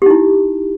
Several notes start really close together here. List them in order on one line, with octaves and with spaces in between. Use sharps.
G4 D#4 E4